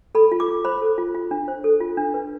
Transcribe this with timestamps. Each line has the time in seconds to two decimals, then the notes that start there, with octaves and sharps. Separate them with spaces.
0.15 A4 B5
0.32 F4
0.40 D6
0.48 F4
0.65 C5 B5
0.82 A4
0.98 F4
1.15 F4
1.31 D4
1.48 C5
1.64 A4
1.80 F4
1.97 D4
2.14 B4